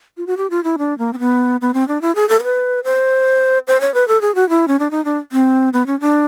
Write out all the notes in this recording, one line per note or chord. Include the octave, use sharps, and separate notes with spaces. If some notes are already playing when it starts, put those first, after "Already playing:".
F4
F#4
G4
F4
E4
D4
A#3
C4
B3
B3
C4
D4
E4
G#4
A4
A#4
B4
C5
C5
C#5
B4
A4
G#4
F#4
E4
C#4
D4
D#4
D4
C4
B3
C#4
D4